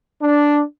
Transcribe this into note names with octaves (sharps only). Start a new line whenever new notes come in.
D4